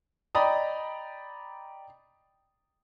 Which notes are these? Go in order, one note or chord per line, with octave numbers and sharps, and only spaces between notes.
D5 D#5 G5 A#5 B5 D#6